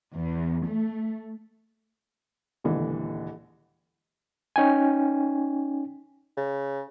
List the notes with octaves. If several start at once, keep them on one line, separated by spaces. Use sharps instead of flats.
E2
A3
D#1 C#2 A#2 D3 E3
C#4 D#4 G5 G#5
C#3